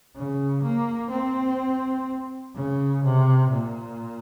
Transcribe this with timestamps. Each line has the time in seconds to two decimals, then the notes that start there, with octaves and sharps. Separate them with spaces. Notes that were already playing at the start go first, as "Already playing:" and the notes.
0.16 C#3
0.63 A#3
1.11 C4
2.55 C#3
3.04 C3
3.51 A#2